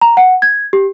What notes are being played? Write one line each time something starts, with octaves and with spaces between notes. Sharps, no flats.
A#5
F#5
G#6
G4